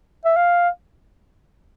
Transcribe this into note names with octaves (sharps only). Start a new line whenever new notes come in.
E5
F5